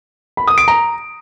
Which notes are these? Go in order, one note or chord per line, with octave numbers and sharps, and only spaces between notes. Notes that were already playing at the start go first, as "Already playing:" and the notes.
B5
D#6
D7
A#5